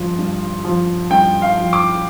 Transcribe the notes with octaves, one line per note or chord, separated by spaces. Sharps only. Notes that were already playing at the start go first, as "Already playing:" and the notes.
Already playing: G2 F3
G2
F3
G2 G5
F5
F3
D6